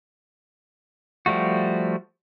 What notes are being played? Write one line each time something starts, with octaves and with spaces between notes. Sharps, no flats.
F3 G3 A3 F#4